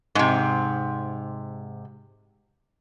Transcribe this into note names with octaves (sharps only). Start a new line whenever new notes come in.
G#2 C3